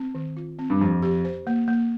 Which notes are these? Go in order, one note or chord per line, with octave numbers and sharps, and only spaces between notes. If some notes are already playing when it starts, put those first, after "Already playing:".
Already playing: C4
D#3
F4
C4
G2
F2 G4
G4
C5
A#3
A#3